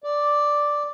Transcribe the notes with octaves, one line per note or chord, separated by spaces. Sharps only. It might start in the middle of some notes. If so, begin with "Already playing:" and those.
D5